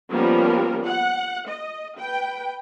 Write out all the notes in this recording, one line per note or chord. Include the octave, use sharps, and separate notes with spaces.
F3 G3 A#3 B3 C#4 A#4
F#5
D#5
B4 G5